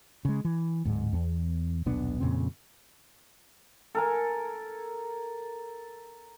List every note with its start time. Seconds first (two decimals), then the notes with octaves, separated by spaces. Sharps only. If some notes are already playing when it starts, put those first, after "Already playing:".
0.25 C#3 G#3
0.45 E3
0.85 D1 G#2
1.13 E2
1.86 D#1 B1 B3 D4
2.20 F2 A#2 C#3 C4
3.95 A4 A#4 G#5